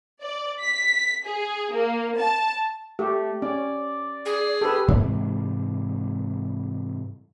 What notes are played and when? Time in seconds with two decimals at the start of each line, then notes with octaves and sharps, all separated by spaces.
0.22 D5
0.62 B6
1.25 G#4
1.72 A#3
2.19 A5
2.99 A3 G4
3.42 C#4 D5
4.25 G#4
4.61 G4 A4 B4
4.88 G#2 C3 E3 G3